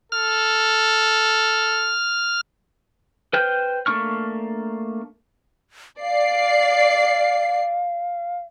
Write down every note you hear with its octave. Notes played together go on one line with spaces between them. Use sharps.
A4 F6
B4 C5 G5 F6 G6
A3 A#3 D4 C#6 F6
D5 F5 C7